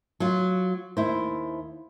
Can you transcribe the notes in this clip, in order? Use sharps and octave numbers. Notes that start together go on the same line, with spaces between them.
F#3 F4
D#2 E4 C5